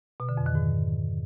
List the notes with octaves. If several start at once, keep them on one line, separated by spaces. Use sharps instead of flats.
B2
D3
F2
D#3
G#2